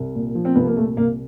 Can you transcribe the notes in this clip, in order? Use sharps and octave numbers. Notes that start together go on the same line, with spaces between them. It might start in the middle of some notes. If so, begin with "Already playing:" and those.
Already playing: C2
A#2
F3
C4
C2 B3
A#3
A#2 A3
C2 A#3